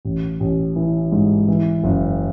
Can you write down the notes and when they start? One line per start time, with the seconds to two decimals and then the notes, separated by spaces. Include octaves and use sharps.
0.05 A1
0.40 A1
0.76 E3
1.12 G#2
1.48 E3
1.84 F#1